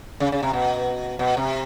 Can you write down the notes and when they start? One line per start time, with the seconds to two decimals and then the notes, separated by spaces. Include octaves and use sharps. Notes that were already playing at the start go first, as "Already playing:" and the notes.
0.20 C#3
0.32 C#3
0.43 C3
0.53 B2
1.19 B2
1.37 C3